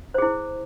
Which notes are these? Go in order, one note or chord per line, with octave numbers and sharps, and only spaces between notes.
E4 G#4 C5